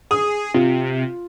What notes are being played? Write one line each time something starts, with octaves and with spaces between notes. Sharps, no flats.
G#4 D#6
C3 F4